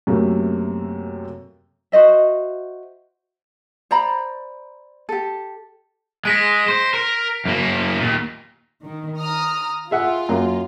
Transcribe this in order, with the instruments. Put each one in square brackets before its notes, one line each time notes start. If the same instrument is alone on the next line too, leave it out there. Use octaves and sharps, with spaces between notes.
[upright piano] F#2 C3 A3 A#3
[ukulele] F#4 C5 D#5 E5
C5 D5 A#5 B5
G4 A4
[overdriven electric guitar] G#3 [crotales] A#6 B6 D7
[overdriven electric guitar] C5
A#4
F#2 A#3
D#2 A#2
[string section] D#3
A#5 D#6 F6
[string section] F4 [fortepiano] G#4 E5 F#5
[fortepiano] F#2 A#3